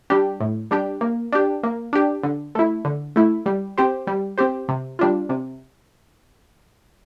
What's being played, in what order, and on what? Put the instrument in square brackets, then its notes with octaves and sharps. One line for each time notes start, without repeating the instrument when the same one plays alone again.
[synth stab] G3 D4 G4
A2
G3 D4 G4
A#3
D4 G4
A#3
D4 G4
D3
A3 E4
D3
A3 E4
G3
C4 G4 C5
G3
C4 G4 C5
C3
G3 D4 F4
C3